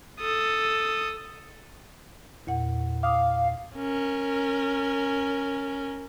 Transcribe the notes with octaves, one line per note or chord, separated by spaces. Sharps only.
A4 D#6
E2 A#2 F#5
F5 D6 D#6
C#4 A#4